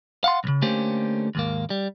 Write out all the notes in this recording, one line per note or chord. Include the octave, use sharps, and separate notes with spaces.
F5 F#5 C6
B1 C#3
D3 A3 A#3 C#4 G4 C5
D#2 G#2 A#3
G3